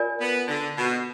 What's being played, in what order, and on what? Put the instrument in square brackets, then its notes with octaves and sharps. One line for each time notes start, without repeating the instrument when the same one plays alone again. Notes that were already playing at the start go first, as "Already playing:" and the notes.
Already playing: [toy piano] F4 A#4 D5 G#5
[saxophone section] B3
D3
B2